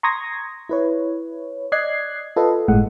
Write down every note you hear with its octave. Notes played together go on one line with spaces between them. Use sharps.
A#5 C6 C#6 D#6 G#6 A#6
E4 B4 C#5
D5 D#5 F#6 G#6 C7
F4 A4 B4 D#5
G1 A2 G#3 F#5